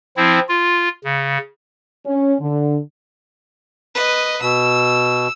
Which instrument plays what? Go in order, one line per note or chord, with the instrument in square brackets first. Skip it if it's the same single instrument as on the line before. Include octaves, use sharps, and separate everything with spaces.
[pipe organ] F3 C4 E4
F4
C#3
[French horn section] C#4
D3
[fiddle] B4 D#5
[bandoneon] B2 [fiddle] E6